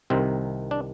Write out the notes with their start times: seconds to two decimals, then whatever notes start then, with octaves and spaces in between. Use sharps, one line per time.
0.10 C2 C3 D#3 C4
0.71 D4